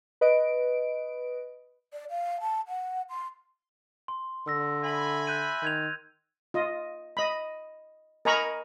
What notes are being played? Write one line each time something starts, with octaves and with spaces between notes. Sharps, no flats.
B4 D#5 D7
D5
F5
A5
F#5
C6
C6
D3 E6 A#6
E5 G#5 B5
F#6 G6 D#7
D#3 G6 G#6 F7
F4 D#5
D#5 B5
A#4 D#5 G#5 A#5 B5 C#6